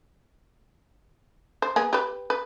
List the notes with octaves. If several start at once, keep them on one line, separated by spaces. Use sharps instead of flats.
C5
A#3 B3 G#4
G4 B4
B4